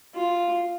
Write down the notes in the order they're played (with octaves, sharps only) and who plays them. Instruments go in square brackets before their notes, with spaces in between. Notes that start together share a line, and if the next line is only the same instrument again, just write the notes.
[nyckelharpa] F4